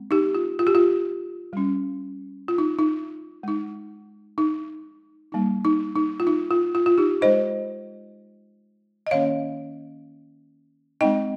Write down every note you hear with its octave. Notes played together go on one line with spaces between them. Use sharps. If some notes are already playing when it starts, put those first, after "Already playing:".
Already playing: G#3 C4
D#4 G4
F4
F4
G4
F4
G3 C#4
F4
D#4
D#4
G#3 D#4
D#4
G3 A#3 D#4
D#4
D#4
F4
D#4
F4
F4
F4
D#4 G4
G#3 D#4 C5 D#5
D#5
D#3 A#3 C#4 C#5 F5
G#3 C4 D#4 D#5 G5